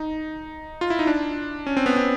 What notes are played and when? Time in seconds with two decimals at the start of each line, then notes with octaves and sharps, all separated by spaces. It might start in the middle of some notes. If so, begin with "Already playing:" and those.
Already playing: D#4
0.81 F4
0.90 E4
0.99 D#4
1.07 D4
1.67 C#4
1.77 C4
1.86 B3
1.97 C4